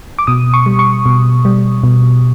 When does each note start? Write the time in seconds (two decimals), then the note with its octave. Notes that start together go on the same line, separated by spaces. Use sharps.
0.19 D6
0.27 B2 D#6
0.54 C#6
0.66 G3
0.79 C#6
1.06 B2
1.45 G3
1.83 B2